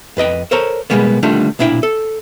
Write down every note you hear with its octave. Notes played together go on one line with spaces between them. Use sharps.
F2 B4 D#5 G5
A4 A#4 C5 C#5 A#5
B2 D#3 G3 G#3 A#3 B3
D3 D#3 G3 A3 D4 F4
B1 A#2 D4 E4 G4 G5
A4